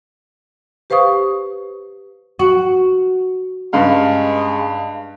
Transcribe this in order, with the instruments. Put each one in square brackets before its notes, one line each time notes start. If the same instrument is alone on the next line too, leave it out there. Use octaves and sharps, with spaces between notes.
[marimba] G4 B4 C5 F5 C#6 D#6
[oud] F#4
[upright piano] G2 C#3 F5 [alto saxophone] G#3